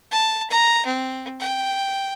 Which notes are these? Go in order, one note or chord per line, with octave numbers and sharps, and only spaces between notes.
A5
A#5
C4
G5